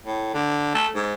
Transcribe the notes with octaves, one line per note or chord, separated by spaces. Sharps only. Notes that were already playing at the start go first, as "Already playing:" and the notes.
A2
D3
A3
G#2